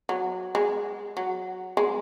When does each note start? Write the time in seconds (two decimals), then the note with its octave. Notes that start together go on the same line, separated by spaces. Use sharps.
0.09 F#3
0.55 G#3
1.17 F#3
1.77 G#3